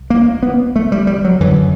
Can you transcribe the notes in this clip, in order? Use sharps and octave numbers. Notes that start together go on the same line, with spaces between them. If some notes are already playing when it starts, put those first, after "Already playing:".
Already playing: C2
A#3
B3
A3
G3
G3
F#3
F#2 D3 E3